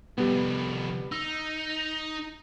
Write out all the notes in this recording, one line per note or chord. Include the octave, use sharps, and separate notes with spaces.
C2 F2 G3 B3
D#4 E6